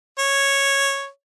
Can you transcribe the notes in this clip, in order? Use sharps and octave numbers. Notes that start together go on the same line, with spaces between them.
C#5